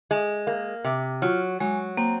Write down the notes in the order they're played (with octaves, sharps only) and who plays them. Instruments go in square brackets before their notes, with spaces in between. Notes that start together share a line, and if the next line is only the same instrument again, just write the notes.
[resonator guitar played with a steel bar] G#3
A#3
C3
[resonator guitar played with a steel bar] F#3 [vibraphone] F4
[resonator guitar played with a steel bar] F#3 [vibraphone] G#3
[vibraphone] A#3 [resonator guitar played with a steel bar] C4